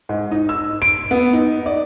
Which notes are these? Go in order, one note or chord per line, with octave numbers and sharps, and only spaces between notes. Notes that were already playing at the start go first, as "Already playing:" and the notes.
G#2
D#4
E6
D7
B3
D#4
D5